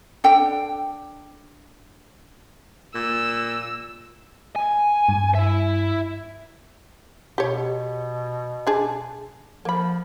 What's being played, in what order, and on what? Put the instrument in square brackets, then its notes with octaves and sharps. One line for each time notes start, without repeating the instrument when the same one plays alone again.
[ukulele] D4 A4 G5
[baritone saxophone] A#2 [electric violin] E6
[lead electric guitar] G#5
[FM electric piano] G2
[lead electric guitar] E4 E5
[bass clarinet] B2 [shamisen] G4 C#5
[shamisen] D4 G#4 A5
[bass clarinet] F3 [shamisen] A#3 B5